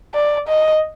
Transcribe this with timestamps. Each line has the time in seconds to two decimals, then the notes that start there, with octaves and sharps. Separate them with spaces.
0.14 D5
0.48 D#5